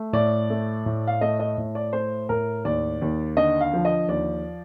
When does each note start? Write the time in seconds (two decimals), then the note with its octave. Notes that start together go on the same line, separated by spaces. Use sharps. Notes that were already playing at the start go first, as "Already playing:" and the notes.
Already playing: A3
0.13 A2 D5
0.50 A3
0.86 A2
1.07 F5
1.21 A3 D#5
1.40 D#5
1.58 A2
1.75 D5
1.93 A3 C5
2.29 A2 A#4
2.65 D#2 D5
3.02 D#2
3.37 D3 D#5
3.61 F5
3.74 F3
3.85 D#5
4.09 D#2 D5